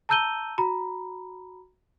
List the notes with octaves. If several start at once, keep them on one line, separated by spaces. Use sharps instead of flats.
A5 A#5 E6 G6 D#7 G7
F#4 A#5 B5